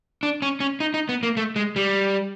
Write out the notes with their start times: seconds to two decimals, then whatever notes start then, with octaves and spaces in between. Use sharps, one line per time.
0.23 D4
0.42 C#4
0.60 C#4
0.80 D#4
0.94 D#4
1.09 B3
1.23 A#3
1.37 A3
1.56 G#3
1.76 G3